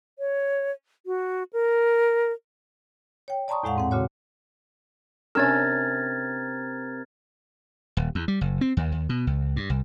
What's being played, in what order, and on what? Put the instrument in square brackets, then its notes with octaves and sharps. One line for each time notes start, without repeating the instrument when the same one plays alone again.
[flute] C#5
F#4
A#4
[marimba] C#5 G5
D5 A5 A#5 C6 C#6 D#6
E2 A2 G#3 F5 F#5
G#2 C4 F#5
A#2 C#3 F#4 C#5
[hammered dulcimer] C3 A#4 [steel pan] C#4 D4 E6 [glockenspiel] F6 G#6 A6
[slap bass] D#1
E2
G3
F#1
C4
D#2
D#2
B2
C#2
G2
C2